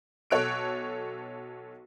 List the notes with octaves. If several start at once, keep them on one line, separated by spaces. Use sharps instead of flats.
B1 A4 C#5 F#6 D7